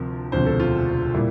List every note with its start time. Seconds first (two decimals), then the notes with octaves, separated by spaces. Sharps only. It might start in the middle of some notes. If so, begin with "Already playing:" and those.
Already playing: D2 C3 F3 A#4
0.32 E1 D2 C3 F3 C5
0.46 A4
0.60 F4
1.14 A#2 G3 E4